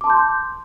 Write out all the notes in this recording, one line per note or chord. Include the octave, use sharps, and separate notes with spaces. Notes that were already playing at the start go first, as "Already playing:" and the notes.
A5 C6 D6 G6